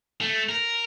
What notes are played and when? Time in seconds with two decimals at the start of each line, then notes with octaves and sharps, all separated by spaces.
0.21 A3
0.49 A#4